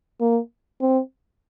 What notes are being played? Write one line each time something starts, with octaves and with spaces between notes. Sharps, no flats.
A#3
C4